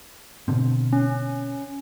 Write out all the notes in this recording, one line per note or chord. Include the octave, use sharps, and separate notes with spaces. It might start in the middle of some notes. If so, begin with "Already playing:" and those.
B2 D3 C4
C#4